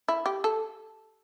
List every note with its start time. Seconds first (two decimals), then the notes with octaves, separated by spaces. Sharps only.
0.08 E4
0.26 G4
0.44 A4